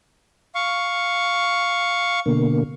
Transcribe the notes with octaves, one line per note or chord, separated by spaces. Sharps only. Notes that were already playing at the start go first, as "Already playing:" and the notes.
F5 C#6
B2 D3 A#3